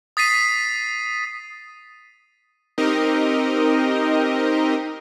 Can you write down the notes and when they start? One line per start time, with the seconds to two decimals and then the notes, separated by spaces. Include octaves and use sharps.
0.17 D#6 A6 B6 C7 D#7
2.78 C4 D#4 G4 A#4 D#5